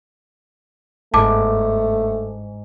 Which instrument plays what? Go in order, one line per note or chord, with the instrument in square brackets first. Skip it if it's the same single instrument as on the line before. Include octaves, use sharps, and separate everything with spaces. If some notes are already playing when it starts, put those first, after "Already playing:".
[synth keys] G1 [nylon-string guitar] G#2 [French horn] A3 [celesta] A5 D6